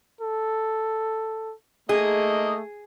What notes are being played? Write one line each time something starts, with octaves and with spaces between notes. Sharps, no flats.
A4
A3 A#3 D#4 G#4 D#5